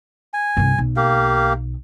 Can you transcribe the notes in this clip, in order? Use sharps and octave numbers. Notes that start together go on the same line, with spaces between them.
G#5
C2 G2
B1
A#3 G4 F5